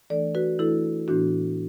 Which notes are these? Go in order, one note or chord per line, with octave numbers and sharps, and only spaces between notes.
E3 A3 D4 A4 D5
F#4 B4
E3 A3 D4 E4 A4
A2 E3 B3 D4 F#4